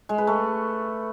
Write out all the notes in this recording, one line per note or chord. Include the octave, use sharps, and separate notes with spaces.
G#3
B4
A3